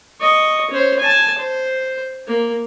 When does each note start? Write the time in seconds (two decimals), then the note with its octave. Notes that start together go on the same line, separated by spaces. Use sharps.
0.21 D#5 C#6
0.71 C#4 C5
1.00 G#5 A5
1.38 C5
2.28 A#3